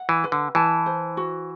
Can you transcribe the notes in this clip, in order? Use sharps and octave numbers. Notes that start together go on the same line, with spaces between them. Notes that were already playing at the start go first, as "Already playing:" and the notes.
Already playing: F#5
E3
B4
D3
E3 A5
C5
F#4